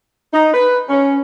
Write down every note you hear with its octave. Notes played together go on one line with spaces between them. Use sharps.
D#4
B4
C#4